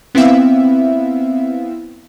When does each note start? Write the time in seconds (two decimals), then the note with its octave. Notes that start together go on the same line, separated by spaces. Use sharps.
0.15 B3 C4 E4 E5 F5